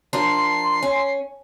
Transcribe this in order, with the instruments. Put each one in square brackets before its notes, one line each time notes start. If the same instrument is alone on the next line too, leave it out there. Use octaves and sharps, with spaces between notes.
[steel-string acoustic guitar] F3 D4 A#4 [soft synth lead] C6 [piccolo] C7
[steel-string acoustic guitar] C#4